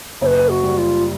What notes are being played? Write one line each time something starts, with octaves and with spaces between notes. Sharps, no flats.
F#1 B4 C#5
F#4
G3
F4